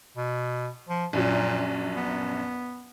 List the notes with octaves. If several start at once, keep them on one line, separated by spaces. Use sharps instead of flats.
B2
F3
A#1 F#2 A#2 F#3
B3